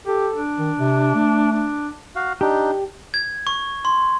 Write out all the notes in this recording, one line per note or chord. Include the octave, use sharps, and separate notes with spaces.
G4 A4
D4
D#3
C3
A3
D4
F#4 F5
D4 D#4 G4
G#6
C#6
C6